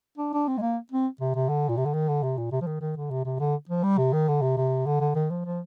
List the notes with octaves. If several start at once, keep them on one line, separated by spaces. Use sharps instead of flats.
D4
D4
C4
G#3
A#3
C4
C3
C3
D3
A#2
C3
D3
D#3
D3
C3
A#2
C3
F3
D#3
D#3
D3
C3
C3
D3
F3
G3
C3
D#3
D3
C3
C3
D3
D3
D#3
F3
F3